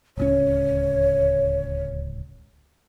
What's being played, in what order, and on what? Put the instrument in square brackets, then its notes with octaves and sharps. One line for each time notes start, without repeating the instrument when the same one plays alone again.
[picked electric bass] D1 C#2 C#4 [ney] C#5